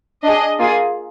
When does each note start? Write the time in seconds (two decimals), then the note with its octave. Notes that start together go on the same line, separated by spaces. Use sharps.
0.23 D4 G#4 D#5
0.58 A#3 F4 G#4